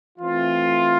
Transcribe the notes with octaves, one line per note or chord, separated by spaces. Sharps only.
E3 A3 C4 F4